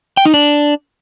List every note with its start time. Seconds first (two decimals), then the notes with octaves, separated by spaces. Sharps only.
0.17 G5
0.25 D#4
0.34 D4